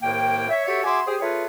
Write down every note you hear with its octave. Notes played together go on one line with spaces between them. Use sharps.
C2 A2 D#3 A#3 G5
C#5 E5
F#4 G4 A4 C#5 E5
F#4 G#4 E5 G#5 C6 D6
G4 G#4 C5
A3 F4 G#4 B4 C#5